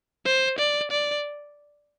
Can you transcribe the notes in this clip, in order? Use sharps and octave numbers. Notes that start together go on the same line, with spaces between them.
C5
D5
D5